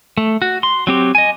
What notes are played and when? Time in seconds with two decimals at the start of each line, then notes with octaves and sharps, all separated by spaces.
0.18 A3
0.42 F#4
0.63 C6
0.87 F#3 C4 G4
1.15 D#5 G#5